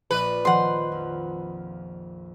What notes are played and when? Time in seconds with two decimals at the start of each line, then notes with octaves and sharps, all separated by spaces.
0.11 A#1 A#3 B4 D5
0.45 D#3 F3 C5 F#5 C6
0.92 F2